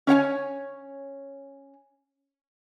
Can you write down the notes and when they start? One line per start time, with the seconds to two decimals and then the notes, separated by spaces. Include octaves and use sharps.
0.07 C#4 C#5 F#5 G#5